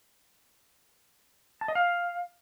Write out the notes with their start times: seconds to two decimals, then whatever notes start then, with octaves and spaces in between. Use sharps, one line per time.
1.61 A5
1.68 D#5
1.75 F5